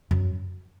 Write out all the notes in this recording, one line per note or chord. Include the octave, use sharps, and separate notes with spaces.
F#2